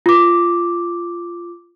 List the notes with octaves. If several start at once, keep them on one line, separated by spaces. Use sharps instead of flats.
F4 D6